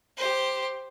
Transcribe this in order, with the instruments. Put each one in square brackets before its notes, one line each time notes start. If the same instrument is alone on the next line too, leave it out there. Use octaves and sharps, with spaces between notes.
[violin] G4 C5